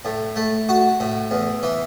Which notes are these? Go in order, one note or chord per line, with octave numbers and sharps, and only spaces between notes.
A2
A3
F#4
A2
E2
E3